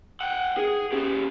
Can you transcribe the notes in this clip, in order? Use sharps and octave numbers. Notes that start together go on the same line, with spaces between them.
F#5 G5
G#4
C#4 G4